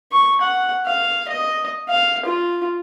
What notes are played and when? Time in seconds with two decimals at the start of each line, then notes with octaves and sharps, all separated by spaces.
0.12 C#6
0.41 F#5
0.86 F5
1.28 D#5
1.89 F5
2.26 F4